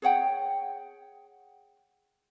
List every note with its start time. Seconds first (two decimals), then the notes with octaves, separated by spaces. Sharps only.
0.02 G#4 C#5 F#5 G5